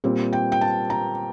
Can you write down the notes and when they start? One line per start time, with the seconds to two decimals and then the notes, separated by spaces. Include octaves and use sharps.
0.04 A#2 G3 C4
0.33 G5
0.52 G5
0.61 A5
0.90 A#5